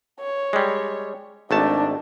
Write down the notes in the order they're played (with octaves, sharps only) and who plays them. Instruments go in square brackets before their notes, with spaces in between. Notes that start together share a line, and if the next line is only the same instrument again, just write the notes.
[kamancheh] C#5
[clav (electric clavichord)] G3 G#3
[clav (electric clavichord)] G#1 A3 A5 [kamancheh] D4 D#4